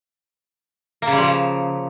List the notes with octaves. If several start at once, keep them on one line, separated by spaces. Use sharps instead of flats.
A#3
C#3
G3
F3
C#3